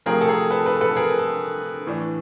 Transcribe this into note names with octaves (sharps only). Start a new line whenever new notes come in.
C3 F3 A3 C4 G#4 A#4
A4
G#4 A#4
A4 B4
A4 B4
A4 B4
G#4 A#4
A4
A2 E3 A3 D4